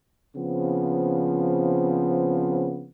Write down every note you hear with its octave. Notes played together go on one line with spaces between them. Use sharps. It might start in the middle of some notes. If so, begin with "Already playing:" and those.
C#3 F3 B3 C4